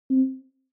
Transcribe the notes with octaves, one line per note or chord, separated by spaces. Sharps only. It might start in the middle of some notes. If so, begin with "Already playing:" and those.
C4